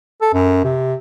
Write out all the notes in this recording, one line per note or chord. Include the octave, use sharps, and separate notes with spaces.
A4
F#2
C3